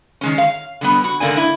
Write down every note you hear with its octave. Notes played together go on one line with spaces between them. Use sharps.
D#3 G#3 C#4
F5
D3 G3 B3
F#4
G#2 D3 A#3 D4 G#5
E4